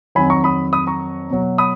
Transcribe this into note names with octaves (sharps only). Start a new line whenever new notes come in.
F2 D#3 F#3 G#5 B5
A#5 C#6
B5 D#6
B5 D#6
A#5 C#6
B2 F#3
B5 D#6